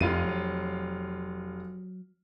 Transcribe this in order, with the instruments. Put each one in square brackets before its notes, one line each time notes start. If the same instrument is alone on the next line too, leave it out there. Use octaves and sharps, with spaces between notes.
[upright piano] F1 F4 D#7 [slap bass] F2
[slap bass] F#3